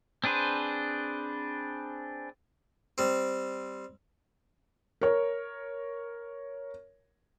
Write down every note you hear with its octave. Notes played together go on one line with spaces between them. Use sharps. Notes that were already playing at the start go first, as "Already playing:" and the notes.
C4 D4 G#4 B4 C5
G3 C4
A#4 C#5